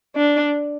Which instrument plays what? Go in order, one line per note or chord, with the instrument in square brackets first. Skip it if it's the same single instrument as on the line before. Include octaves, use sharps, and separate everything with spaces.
[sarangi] D4